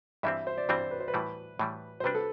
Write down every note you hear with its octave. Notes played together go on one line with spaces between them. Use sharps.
G2 E3 G3 C4 E5
C5
D5
G2 E3 G3 C4 C5
B4
C5
B4
A2 E3 G3
A2 E3 G3
C5
C3 G3 D4 B4
A4